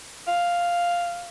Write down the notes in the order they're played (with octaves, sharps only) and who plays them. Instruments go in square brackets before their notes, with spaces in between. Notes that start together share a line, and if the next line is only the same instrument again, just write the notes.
[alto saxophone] F5